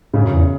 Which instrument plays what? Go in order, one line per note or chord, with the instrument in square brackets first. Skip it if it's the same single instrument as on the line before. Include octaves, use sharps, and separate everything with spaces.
[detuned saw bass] G#2 [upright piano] C#3
[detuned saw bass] F#2
E2